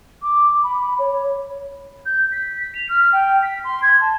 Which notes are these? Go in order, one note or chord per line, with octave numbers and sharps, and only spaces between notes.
D6
B5
C#5
G6
B6
B6
F7
F6
G5
B6
C6
G#6
A5